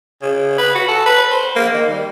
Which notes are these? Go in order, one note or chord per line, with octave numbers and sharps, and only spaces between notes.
C#3
B4
F#4
A4
B4
C5
A#3
D#3
G3